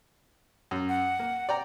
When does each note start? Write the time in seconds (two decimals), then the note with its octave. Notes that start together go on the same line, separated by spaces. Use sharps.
0.71 F#2
0.89 F#5
1.19 A#3
1.49 D5 G5 A#5